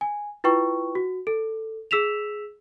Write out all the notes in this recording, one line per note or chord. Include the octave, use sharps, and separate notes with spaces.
G#5
E4 F4 B4 G5 C#6
F#4
A4
G#4 E6 B6 E7 F7